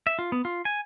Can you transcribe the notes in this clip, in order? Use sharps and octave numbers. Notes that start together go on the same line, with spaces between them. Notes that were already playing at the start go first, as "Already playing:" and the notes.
E5
F4
B3
F4
G#5